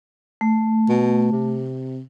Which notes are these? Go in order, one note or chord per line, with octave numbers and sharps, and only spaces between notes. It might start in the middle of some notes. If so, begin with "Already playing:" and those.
A3
B2
C3